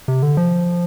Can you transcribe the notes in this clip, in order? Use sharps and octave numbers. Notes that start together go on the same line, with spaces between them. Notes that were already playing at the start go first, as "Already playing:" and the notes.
C3
D3
F3